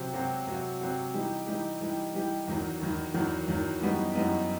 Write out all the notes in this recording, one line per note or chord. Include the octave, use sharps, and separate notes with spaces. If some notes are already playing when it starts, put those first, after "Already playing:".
Already playing: C3 F#3 C4 F#4
C3 F#3 C4 F#4
C3 F#3 C4 F#4
C3 F#3 C4 F#4
E3 G3 D#4 G4
E3 G3 D#4 G4
E3 G3 D#4 G4
E3 G3 D#4 G4
E2 D#3 F#3
E2 D#3 F#3
E2 D#3 F#3
E2 D#3 F#3
F#2 E3 G3 B3 D#4
F#2 E3 G3 B3 D#4